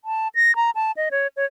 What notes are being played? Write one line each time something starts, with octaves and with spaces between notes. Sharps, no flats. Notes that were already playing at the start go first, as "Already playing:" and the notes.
A5
A#6
A#5
A5
D#5
C#5
C#5